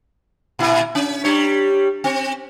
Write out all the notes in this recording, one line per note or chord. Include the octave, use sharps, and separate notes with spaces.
A#2 E4
C#4
G3 D4 C#5
C4